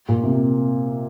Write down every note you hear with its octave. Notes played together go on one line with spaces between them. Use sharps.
A#2
C3